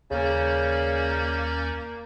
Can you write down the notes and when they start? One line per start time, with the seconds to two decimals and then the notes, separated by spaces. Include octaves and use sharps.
0.11 D#2 C#3 A#3 C#4 D5 G6